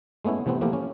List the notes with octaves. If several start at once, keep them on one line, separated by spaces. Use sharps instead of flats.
G#3 A3 B3 C#4 E4
C3 E3 A3 B3 C4
F3 A3 A#3 E4 G4 A#4
C#4